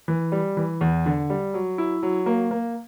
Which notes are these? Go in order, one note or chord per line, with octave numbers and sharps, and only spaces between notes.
E3
G3
E3
E2
D3
G3
F#3
E4
F#3
A#3
A#3